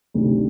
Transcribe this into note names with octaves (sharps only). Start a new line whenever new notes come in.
D2 C3 D#3